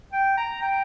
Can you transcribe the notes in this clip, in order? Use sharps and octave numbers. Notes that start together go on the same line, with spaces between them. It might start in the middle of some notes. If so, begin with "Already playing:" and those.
G5
A#5
G5